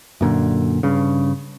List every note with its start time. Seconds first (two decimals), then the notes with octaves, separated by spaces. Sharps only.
0.21 F#2 A#2 D3
0.83 G2 C#3